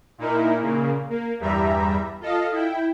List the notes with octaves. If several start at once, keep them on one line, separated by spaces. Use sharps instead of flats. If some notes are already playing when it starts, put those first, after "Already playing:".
A#2 D#4 E4 A#4
A#2 C#3 A#3
A#3
E2 G2 G3 E5 A#5 B5
F4 A4 D#5 F5
E4 G5